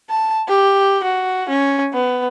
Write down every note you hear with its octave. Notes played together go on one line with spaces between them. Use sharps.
A5
G4
F#4
C#4
B3